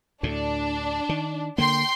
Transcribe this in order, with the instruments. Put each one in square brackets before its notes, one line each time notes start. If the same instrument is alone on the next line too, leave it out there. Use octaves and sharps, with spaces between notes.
[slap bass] D2 A2 [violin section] D4
[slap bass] D#3
[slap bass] D3 A#3 [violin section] G5 C6